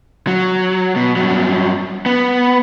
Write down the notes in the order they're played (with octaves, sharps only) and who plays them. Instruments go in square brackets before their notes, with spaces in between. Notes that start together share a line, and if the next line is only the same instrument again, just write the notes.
[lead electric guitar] F#3
B2
G2 F#3
B3